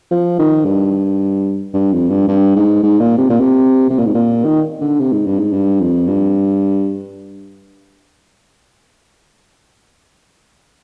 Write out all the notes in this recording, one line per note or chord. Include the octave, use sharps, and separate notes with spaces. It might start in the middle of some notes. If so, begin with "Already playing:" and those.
F3
D#3
G2
G2
F2
G2
G2
G#2
G#2
A#2
C3
A#2
C3
C3
A#2
G#2
A#2
D#3
D3
C3
G#2
G2
G#2
G2
F2
G2